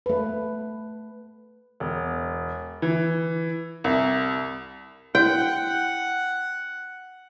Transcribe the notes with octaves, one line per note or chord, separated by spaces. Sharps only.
A3 B4
E1
E3
C2
E4 F#5 G5